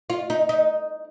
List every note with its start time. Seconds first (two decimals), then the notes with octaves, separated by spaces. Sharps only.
0.10 F4
0.30 D#4
0.49 D#4